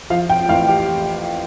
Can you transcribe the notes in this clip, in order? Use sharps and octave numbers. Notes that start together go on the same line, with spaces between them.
F3 F5
G5
A1 F5
G4